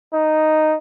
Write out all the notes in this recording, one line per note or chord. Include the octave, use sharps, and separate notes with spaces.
D#4